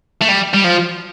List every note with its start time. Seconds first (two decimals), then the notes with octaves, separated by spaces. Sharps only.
0.21 A3
0.28 G3
0.53 G3
0.64 F3